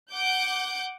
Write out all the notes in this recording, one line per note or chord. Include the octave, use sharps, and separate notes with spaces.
F#5 D6 G6